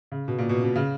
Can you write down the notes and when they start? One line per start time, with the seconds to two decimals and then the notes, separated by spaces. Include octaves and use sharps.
0.12 C#3
0.28 B2
0.38 A#2
0.49 B2
0.64 B2
0.75 C#3